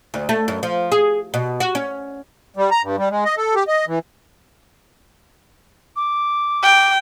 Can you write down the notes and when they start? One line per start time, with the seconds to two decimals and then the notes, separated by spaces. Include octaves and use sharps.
0.14 D2
0.29 A3
0.48 F#2
0.63 F3
0.92 G#4
1.34 B2
1.60 F#4
1.75 C#4
2.57 G3
2.71 A#5
2.83 G2
2.97 G3
3.10 G#3
3.25 D#5
3.37 A4
3.55 G4
3.68 D#5
3.87 E3
5.96 D6
6.63 G5